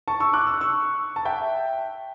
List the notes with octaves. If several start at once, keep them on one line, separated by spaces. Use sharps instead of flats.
A5 C#6
C#6 E6
D6 F#6
E6
F#6
C#6 E6
A5
E5 G5